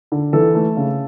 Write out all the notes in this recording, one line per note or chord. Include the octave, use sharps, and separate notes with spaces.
D3
E3 A4
A3
C#3